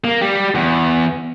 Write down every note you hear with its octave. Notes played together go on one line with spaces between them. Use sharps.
A#3
G3 G4
E2